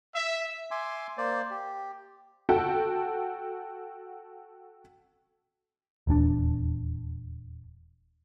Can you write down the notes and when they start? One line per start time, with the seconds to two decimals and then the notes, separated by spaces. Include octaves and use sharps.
0.14 E5
0.71 E5 G#5 C6 D6
1.18 A#3 C5 D5
1.50 G4
2.49 F#4 A4 F#5 G5 A5
6.07 D#1 E2 C#4 D4